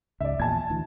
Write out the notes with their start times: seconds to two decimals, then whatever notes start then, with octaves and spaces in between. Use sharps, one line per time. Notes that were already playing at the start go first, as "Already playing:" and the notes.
0.20 C#2 G#2 D5 E5
0.40 A#1 E2 A#2 G#5 A5 G#6
0.70 D2 E3